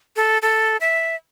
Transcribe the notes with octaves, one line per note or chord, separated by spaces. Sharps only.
A4
A4
E5